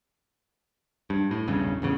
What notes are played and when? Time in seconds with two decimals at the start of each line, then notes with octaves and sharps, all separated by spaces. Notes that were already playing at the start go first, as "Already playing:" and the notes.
1.10 G2
1.31 A2
1.47 E1 B1 G2 C#3
1.82 A1 E2 C#3